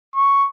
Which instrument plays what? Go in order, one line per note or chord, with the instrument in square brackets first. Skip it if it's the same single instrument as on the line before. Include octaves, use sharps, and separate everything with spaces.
[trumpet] C#6